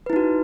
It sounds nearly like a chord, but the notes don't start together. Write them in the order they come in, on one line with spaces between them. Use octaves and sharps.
B4 E4 D#4 F#4